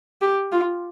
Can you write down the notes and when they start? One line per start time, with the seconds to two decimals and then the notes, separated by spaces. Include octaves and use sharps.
0.22 G4
0.53 F4